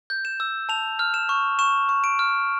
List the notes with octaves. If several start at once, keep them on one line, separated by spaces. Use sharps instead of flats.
G6
E7
E6
A5 F7
F6
E7
C#6
C#6 E7
C#6
D7
F6